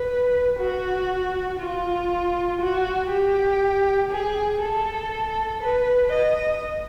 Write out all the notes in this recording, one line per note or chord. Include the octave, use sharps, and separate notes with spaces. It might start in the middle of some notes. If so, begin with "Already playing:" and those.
Already playing: B4
F#4
F4
F#4
G4
G#4
A4
B4
D#5